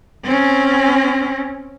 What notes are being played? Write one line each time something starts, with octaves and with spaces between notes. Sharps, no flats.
C4 C#4